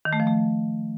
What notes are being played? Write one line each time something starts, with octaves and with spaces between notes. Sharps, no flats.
D#3
A3
F3
A3